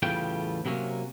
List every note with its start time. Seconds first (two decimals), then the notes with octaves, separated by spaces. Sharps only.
0.03 E2 A2 C#3 G3 F4 G5
0.65 C3 F#3 A#3 C#4